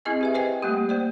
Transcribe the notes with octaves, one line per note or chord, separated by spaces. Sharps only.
C4 E4 G#4 D#5 G#5
G4 B4 E5
B4 C5 D#5 G5 G#5
G3 A3 A#3 G4
A#3 C5 D5